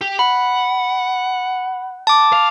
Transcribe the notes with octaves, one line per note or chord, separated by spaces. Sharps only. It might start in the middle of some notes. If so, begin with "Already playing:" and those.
G4
F#5 B5
A5 D6
F5